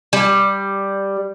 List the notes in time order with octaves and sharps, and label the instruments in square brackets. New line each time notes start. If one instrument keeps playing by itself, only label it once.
[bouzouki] G3